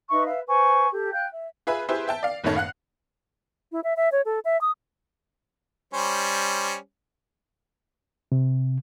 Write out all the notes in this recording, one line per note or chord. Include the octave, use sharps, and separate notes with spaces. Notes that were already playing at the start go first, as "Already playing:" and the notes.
D#4 B4 E5 C#6
B4 E5 F5
B4 C5 G#5 C#6
G4 A4
F5 G5 F#6 G6
E5
F4 G#4 B4 E5 B5
E4 G4 G#4 B4 C5 E5
E5 G5 A5
D5 F5
F#1 A2 D#3 A3 C#5 A5
F5 F#5 F#6
E4
E5
E5
C#5
A4
E5
D#6
G3 C#4 C5
C3